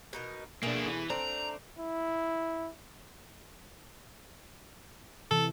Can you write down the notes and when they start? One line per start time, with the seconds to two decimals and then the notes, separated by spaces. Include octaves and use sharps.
0.13 B2 D#4 A#4
0.63 B2 A3 A#3 D4 G#4
0.86 E3
1.10 A3 C4 D4 A#5
1.79 E4
5.31 C3 E3 A4